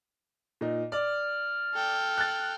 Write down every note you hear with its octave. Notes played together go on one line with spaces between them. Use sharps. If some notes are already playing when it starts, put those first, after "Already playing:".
A#2 D#4
D5 F6
A4 G5
F#6 A6